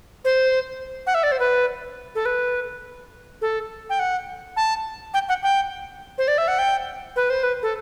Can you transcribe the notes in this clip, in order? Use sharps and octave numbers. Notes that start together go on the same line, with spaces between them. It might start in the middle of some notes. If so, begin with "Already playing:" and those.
C5
F#5
E5
D5
C5
B4
A4
B4
A4
G5
F#5
A5
G5
F#5
G5
C5
D5
E5
F#5
G5
B4
C5
B4
A4